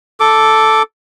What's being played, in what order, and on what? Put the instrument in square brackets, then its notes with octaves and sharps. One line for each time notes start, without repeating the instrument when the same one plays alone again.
[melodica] A4 D6